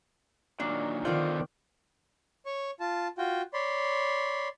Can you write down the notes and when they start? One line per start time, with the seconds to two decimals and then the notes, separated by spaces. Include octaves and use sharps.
0.60 A#2 D#3 F#3 D4
1.05 D#3 B3 D4 F4 A4 C5 D5
2.46 C#5 C#6
2.80 F4 A5
3.18 F4 F#4 G5
3.53 C#5 D5 B5 C6